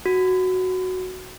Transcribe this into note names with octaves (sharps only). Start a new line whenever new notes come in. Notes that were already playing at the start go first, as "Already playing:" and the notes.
F#4